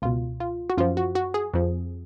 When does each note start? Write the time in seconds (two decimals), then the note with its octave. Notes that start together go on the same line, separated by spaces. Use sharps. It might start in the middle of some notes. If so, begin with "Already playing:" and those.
0.02 C#2 B2 F4
0.40 F4
0.70 F#4
0.77 F#2 F3 F4
0.97 F#4
1.15 F#4
1.34 G#4
1.54 F2 F3